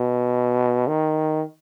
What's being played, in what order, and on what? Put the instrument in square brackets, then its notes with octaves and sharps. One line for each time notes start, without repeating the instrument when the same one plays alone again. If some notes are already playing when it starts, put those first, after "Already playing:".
Already playing: [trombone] B2
D#3